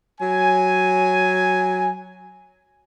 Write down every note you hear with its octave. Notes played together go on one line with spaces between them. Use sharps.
F#3 C#5 G#5